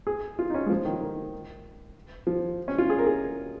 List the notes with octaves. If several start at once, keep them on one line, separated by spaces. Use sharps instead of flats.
G#4
F4
D#4
C#4
G#3
F3
D#3
D#3
F3
C#4
F4
G#4
A#4
G#4